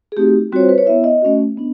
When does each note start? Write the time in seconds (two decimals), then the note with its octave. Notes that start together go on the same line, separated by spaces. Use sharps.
0.12 G#4
0.17 A3 C4 D#4 F#4 G4
0.52 G3 C4 F4 F#4 C#5
0.60 C5
0.69 B4
0.78 C#5
0.86 B3 E4 E5
1.04 D#5
1.22 A3 C#4 F#4
1.58 B3 D4